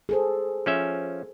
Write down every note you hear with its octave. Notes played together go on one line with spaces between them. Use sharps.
G#4 A4 C5
F3 C#4 E5